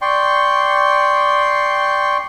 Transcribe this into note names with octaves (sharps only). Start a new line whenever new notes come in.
D5 G5 C6 C#6